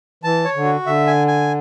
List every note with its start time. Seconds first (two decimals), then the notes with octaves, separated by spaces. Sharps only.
0.24 E3 A5
0.44 C#5
0.55 D3
0.65 F#4
0.86 D3 E5
1.07 G#5
1.28 G#5